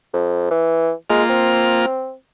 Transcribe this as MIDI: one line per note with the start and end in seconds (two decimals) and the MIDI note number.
0.13 0.47 41
0.51 0.91 52
1.10 1.23 56
1.10 1.86 58
1.10 1.86 65
1.29 2.13 60